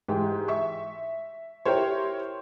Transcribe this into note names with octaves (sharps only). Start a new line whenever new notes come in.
G#2 E3 G4
E5 C#6
E4 G4 A#4 C5 C#5